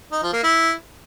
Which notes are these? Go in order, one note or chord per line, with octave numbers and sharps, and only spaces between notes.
D#4
F3
A#3
E4